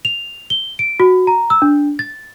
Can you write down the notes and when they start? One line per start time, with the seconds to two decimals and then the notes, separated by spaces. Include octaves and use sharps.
0.05 F7
0.50 G7
0.79 D7
1.00 F#4
1.27 A#5
1.50 E6
1.62 D4
1.99 A6